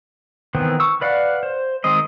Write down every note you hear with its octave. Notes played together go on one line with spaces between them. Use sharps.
D#3 E3 B3 C4
C#6 E6
B4 D5 F5 F#5
C5
D#3 G#3 C4 D#5